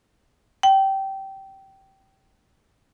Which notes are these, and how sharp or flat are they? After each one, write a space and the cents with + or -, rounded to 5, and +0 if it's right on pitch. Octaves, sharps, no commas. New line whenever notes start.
G5 -20